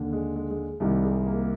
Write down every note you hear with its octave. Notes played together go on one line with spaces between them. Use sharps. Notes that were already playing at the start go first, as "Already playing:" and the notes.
Already playing: D#2 D3
G#3
G#3
G#3
C2 C3 D#3 G3
G#3
A#3